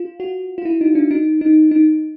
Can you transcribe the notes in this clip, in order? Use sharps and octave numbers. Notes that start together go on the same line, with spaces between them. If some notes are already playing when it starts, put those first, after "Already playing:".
Already playing: F4
F#4
F4
E4
D#4
D4
D#4
D#4
D#4